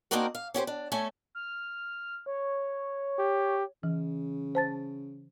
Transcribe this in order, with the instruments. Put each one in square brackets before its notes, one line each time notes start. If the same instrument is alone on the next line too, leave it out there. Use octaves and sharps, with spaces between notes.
[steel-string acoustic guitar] A#3 C4 D4 D#4 F#4 A#4
F5
C#4 F#4 G4 C5
D4
A3 C#4 A4 G#5
[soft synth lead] F6
C#5
[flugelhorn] G4
[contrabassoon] C#3 [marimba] E3
[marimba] C5 A5 A6